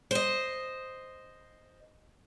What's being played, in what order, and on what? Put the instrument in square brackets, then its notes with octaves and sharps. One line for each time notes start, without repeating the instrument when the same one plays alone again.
[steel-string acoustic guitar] C5 D#5